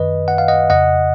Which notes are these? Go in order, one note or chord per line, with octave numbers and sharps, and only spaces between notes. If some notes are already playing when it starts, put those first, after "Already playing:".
Already playing: F#2 D#3 B4 D#5
F#5
F5
D#5 F#5
F2 C#3 D#5 F#5